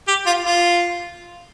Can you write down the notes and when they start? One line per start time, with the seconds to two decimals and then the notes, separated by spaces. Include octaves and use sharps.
0.08 G4
0.26 F4
0.44 F4